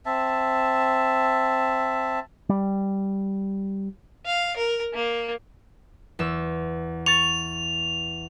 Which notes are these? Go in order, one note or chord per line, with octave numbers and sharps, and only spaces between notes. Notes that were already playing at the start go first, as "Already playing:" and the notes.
C4 E5 A5
G3
F5
A#4
A#3
E2 E6
C#6 A6 F7